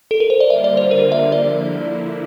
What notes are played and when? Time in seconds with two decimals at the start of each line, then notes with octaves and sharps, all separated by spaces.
0.11 A4
0.20 A#4
0.30 C5
0.40 D5
0.50 D3 G3 A#3 F4 E5
0.64 D5
0.77 C5
0.91 A#4
1.12 E5
1.32 D3 F3 A#3 E4 D5